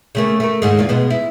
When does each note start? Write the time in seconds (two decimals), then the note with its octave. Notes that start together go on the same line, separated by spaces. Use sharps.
0.15 C#3 A3 A#3
0.40 A3 A#4
0.62 D#2 G#2 G#3
0.77 E2 A#3 F4
0.89 B2 G#3 B3
1.10 E4